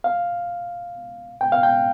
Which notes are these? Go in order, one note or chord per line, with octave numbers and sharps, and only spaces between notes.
F5
G5
F5
G5